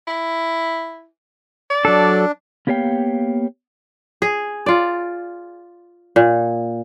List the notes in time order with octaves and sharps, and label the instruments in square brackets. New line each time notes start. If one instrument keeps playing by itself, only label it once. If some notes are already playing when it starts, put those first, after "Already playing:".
[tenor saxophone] E4
D5
[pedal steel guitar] F#3 A4 [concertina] D4
[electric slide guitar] A#3 B3 G4 C#5 F5 G5
[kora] G#4
F4 D5
A#2